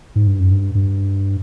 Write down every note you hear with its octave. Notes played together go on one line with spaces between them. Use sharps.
G#2
G2
F#2
G2
G2